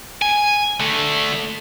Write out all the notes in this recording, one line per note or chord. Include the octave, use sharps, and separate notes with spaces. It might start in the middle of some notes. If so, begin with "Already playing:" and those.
G#5
D3 A3